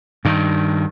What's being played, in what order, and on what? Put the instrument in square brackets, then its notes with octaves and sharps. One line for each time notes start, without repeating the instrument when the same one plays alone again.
[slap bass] G2 D#3